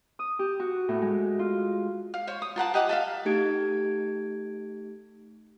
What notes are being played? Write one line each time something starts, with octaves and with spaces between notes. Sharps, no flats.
D#6
G4
F#4
A2
G#3
F4
F5
C5 C#5
D#6
F4 A#4 F#5 A5
G4 D#5 F#5 D6
A4 E5 F5
A3 D#4 G4 G#6 D7